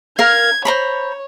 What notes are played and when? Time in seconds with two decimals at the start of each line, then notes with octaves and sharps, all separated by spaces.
0.19 A#4 F5 G#6
0.65 C5 C#5 A#5 B5